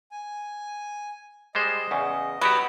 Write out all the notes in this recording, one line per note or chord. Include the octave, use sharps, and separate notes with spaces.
G#5
G3 G#3 C5 D#5
E2 C#3
F#3 B3 F#4 G4